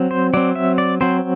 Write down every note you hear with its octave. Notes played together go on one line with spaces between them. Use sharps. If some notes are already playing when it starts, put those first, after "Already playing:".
Already playing: F#3 C4
C5
F#3 C4 D5
E5
D5
F#3 C4 C5